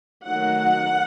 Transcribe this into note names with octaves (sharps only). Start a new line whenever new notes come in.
D#3 F#3 A3 D#4 F#5